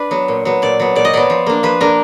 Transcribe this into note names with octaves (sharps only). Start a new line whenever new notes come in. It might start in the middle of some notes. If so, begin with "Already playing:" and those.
Already playing: D4 B4 D5
F#3 B3
A#2
F#3 B3
A#2 D5
F#3 B3
A#2 D5
D#5
F#3 B3 D5
F3
A#3 D4
F3 B4
A#3 D4 A#4